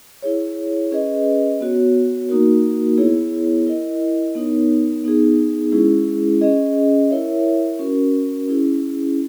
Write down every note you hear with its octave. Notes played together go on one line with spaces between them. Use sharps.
E4 G#4 C#5
C#4 G#4 B4 D#5
B3 F#4 C#5
A#3 D#4 F#4 A#4
B3 E4 G#4 C#5
E4 A#4 D#5
B3 D#4 A#4 C#5
B3 D#4 G#4
G#3 C#4 E4 G#4
C#4 G#4 D#5
E4 A#4 C#5 E5
C#4 F#4 A#4
C#4 E4 G#4